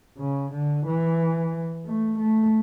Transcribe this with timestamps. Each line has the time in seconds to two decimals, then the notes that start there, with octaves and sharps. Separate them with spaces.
0.18 C#3
0.53 D3
0.86 E3
1.86 A3
2.19 A3